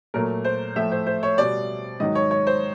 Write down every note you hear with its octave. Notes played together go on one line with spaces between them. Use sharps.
A#2 F#3 A3 A#4
C5
A2 F3 A3 E5
C5
C5
C#5
B2 G3 D5
G#2 D#3 F#3 D#5
C#5
C#5
C5